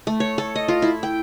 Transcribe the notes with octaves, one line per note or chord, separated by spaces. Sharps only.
A3
C#5
A4
D#5
F4
E4
G5